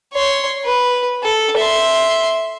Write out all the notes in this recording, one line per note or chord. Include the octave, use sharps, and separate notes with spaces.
C#5 C6
B4
A4
E5 C6